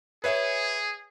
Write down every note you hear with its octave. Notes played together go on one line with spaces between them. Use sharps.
G#4 B4 C#5 E5